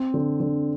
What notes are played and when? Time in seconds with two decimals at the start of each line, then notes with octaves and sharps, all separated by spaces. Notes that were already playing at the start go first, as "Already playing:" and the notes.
Already playing: C4
0.14 D3
0.40 D3